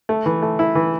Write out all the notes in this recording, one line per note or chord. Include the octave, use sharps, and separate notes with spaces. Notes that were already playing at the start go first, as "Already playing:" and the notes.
A3
E3
A3
E4
E3